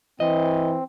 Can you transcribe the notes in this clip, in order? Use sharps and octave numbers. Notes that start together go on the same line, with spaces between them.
E3 C4 D#5